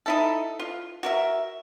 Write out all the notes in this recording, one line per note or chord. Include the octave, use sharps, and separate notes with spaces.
D#4 E4 A4
F4
F#4 A#4 E5